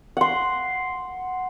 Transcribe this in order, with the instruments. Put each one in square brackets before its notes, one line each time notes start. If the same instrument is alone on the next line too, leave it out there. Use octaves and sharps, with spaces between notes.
[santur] F#5 C6